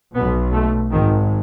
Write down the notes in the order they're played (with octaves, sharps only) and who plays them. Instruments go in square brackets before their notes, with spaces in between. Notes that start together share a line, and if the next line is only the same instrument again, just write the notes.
[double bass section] B1 B2 B3
A3
G#1 G#2 D#3